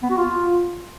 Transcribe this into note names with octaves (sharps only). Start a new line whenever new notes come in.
B3
F#4
F4